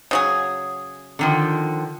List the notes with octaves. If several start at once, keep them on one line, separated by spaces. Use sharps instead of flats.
C#3 F#3 G#4
D3 D#3 F3